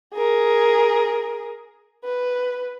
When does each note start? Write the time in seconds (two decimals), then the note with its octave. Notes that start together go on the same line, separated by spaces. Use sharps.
0.15 G#4 A#4
2.05 B4